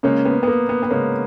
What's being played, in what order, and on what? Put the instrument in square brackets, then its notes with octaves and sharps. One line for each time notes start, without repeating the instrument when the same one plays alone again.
[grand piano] C#3 G#3 C#4 [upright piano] A#3
[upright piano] B3
B3
A#3
B3
B3
[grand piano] C#3 G#3 C#4 [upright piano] A#3